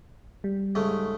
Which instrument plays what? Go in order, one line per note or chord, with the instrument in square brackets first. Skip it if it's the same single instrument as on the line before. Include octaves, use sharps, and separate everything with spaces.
[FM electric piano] G3
[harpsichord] G#2 C#3 A3